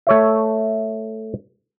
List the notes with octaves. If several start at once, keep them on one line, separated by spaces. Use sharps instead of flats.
A3 C#5 E5